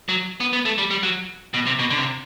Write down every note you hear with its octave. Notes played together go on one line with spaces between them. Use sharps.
F#3
B3
B3
A3
G3
G3
F#3
B2
C3
B2
D3
C3